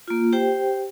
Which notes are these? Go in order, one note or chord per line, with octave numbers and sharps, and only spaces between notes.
A#3 F4
G4 C5 G5